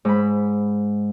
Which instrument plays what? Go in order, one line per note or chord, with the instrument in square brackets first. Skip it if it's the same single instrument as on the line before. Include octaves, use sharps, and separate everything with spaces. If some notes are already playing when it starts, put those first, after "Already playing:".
[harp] G#2 B5